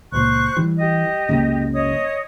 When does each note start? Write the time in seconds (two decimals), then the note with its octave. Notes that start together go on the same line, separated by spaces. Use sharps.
0.12 C#2 A#2 C5 C#6 F#6
0.57 E3 G3
0.78 G4 D#5
1.29 F1 C#2 F#2 C#3 F#3 A#3
1.73 C#5 D#5 D#6